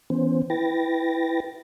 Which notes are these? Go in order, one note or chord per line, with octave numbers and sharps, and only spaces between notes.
E3 B3 C#4 C5
E4 B4 G5 A6 A#6